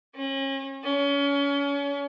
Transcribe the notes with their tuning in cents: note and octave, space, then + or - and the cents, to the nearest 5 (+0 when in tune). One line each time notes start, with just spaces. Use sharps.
C#4 -35
C#4 +30